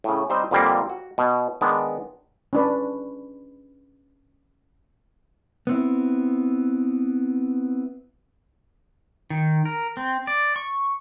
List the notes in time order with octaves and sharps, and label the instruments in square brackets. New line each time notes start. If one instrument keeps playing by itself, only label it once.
[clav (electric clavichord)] A2 C#3
G3 C4 D#4 C5 D#5
F2 A#2 D3 G3 A#3 C4
F#4
B2
D#3 G#3 B3 D4
[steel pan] C#4 D4 B4
[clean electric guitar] B3 C4 E4
[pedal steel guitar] D#3
A#4
C4
D5
C#6